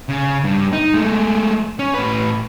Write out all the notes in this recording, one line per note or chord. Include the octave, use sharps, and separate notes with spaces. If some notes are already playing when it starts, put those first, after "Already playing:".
C#3
G2
D#4
G#3 A3
C#4
A2 B4